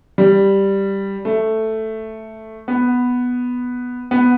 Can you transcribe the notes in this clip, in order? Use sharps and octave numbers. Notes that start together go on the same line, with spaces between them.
G3
A3
B3
B3